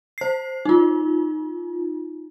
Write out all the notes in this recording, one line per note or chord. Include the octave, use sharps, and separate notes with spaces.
C5 C7
D#4 F4